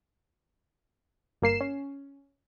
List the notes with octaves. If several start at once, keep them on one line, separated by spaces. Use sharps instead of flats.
G1 A#3 C7 E7
C#4